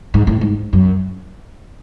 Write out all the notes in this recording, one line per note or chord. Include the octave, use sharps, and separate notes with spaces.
G#2
A2
G#2
F#2